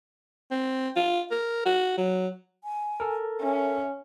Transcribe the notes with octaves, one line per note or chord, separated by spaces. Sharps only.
C4
F4
A#4
F#4
F#3
G#5
A4 A#4
C#4 E5